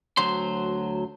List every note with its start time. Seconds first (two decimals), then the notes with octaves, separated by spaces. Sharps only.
0.17 D2 F#3 C5 C6